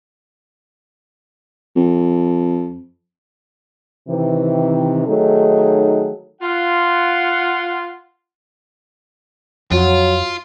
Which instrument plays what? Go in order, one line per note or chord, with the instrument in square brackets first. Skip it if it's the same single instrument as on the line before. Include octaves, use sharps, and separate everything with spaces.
[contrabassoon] F2
[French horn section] C3 D#3 E3
D#3 F#3 A3 D#4 G#4 A4
[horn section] F4 F#5
[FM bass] F2 [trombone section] F#3 [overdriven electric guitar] F4